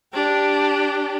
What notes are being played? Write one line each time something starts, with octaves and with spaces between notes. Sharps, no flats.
D4 G4